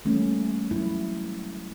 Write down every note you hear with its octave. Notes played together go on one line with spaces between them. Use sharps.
E3 G3 A3 A#3 C#4
F#3 E4